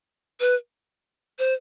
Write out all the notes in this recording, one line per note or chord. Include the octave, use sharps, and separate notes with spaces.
B4
C5